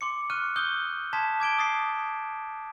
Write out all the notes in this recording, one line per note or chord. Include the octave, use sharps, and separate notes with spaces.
C6 D6 C#7
C#6 F6 F#6 D#7
C#6 D#6 F#6 G6 G7
A5 C6 D#6 G#6 B6 E7
D6 G#6 D7 G7
D#6 A6 C7